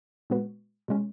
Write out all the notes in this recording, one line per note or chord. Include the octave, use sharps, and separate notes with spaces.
A#2 G#3 B3 F#4 B4
B2 G#3 C#4